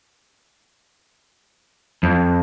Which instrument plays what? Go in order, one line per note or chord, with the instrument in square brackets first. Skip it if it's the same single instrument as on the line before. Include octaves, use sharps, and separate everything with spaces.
[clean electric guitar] F2